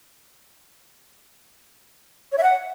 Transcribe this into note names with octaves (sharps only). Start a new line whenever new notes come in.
C#5
E5
F#5